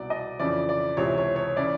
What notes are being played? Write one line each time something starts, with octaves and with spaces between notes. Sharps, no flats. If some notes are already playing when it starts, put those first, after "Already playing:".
Already playing: C2 B2 D5
D#5
F2 C#3 E3 D5
D5
C#2 C3 E3 C#5
C#5
C#5
C#3 E3 D5